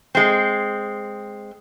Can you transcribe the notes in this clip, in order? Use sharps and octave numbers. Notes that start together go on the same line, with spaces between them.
G#3 C4